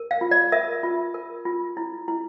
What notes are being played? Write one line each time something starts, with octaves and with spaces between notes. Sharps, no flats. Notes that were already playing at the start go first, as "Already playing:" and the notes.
Already playing: A#4
F5
F4
D5
A#4 E5
F4
A#4
F4
E4
E4